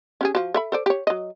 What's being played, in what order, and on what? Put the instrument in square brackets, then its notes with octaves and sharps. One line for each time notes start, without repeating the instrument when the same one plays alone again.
[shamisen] C#4 G4 G#4
F3 F#4
A4 E5 B5
A4 C5 D5
G4 C#5
F#3 D#5